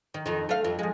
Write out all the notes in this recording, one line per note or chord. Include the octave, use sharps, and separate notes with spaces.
D#3
F2 D#3
A3 F5
F2
F3 G#3